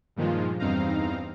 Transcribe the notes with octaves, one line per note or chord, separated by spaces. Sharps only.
G2 A#2 D#3 F3 G#3 F4
E2 G2 C4 D#4 F5 A#5